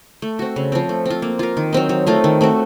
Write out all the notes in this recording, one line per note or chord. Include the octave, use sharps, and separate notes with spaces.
A3
C4 F#4
C#3
F3 C4
A3
C4 F4
A#3
F4 A#4
D#3
F#3 C4 D#4
F#3
A3 C4 F4
D#3
A3 C4 F#4